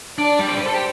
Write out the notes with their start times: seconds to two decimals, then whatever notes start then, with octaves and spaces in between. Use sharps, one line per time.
0.17 D4 D5
0.39 G3
0.49 C5
0.57 B4
0.61 A4 C5
0.74 G4